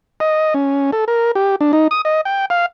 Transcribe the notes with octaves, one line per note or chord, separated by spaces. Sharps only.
D#5
C#4
A4
A#4
G4
D4
D#4
D#6
D#5
G5
F5